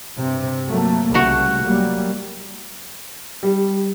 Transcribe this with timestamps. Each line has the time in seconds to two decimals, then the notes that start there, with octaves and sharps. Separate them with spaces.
0.18 G2 C3
0.68 F#3 A3 A#3
1.14 C2 C#3 A3 F#4
1.61 F#3 G3 A#3
3.43 G3